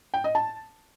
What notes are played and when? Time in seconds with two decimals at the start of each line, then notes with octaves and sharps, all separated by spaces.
0.14 G5
0.24 D#5
0.35 A5